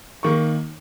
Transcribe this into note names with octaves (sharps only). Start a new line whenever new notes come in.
D#3 A#3 C#6